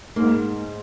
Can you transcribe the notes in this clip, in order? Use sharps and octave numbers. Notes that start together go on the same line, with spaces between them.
G#2 A#3